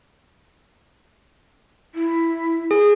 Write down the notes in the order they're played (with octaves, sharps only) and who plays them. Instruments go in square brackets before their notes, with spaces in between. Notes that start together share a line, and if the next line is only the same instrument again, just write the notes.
[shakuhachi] E4
[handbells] G#4